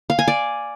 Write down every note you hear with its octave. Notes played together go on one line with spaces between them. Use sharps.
F5
G#5
D5